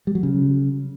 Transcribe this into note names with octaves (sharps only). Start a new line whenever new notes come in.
G3
F#3
C#3